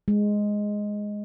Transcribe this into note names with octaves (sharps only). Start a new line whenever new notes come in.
G#3